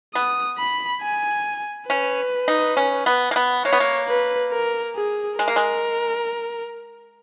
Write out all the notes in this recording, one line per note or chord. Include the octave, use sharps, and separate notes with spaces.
B3 D#6
B5
G#5
C#4 B4
D#4
C#4
B3
A#3
B3
A#3 C#5
B3
A#3
B4
A#4
G#4
G#3 A#4
A#3
G#3